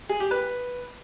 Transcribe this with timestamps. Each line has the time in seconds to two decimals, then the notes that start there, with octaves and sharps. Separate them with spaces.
0.09 G#4
0.20 G4
0.31 B4